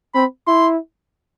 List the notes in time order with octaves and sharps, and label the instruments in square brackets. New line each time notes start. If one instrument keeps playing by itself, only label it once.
[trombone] C4 [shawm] B5
[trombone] E4 [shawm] C6